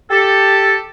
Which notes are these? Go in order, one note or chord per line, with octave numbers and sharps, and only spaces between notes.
G4 A4